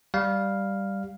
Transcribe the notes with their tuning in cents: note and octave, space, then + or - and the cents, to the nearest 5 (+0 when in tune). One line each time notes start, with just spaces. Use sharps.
G3 +0 F5 +0